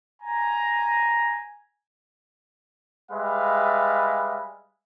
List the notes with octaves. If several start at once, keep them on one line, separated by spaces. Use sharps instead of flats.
G#5 A#5
G3 G#3 B4 E5 F5